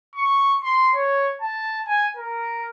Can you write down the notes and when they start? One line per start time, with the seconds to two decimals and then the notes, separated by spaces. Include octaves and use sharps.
0.15 C#6
0.63 C6
0.95 C#5
1.42 A5
1.87 G#5
2.17 A#4